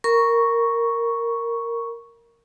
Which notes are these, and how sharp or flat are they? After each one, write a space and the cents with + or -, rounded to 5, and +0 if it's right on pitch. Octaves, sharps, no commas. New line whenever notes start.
A#4 -10 A#5 +45 C#6 +0